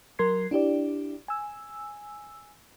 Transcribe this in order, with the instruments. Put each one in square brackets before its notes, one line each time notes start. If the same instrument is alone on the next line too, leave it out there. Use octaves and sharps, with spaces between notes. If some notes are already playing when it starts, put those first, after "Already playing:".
[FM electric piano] F#3 A#4 C6 G#6 C7
D4 E4 G4 D5
G#5 E6